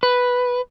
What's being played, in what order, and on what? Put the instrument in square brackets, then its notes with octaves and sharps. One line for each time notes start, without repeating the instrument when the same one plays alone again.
[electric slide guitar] B4